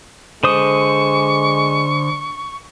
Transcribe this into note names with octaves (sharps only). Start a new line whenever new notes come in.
D3 G#3 C5 C#6 D#6